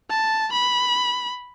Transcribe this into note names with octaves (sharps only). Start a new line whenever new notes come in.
A5
B5